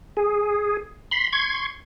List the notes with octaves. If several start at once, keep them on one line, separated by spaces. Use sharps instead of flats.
G#4
B5 C6
C6 C#6 G#6